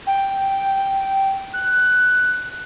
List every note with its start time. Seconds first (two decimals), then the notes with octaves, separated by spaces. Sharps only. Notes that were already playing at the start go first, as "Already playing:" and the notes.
0.07 G5
1.54 F#6